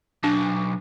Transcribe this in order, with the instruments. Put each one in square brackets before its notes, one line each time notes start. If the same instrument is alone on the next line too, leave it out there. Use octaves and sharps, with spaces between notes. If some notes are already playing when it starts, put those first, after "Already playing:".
[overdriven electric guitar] B1 [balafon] D4